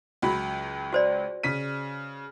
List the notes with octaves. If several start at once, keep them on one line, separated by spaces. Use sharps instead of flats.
C#2 F#3 B5
F#4 C5 D5
C#3 B6 D#7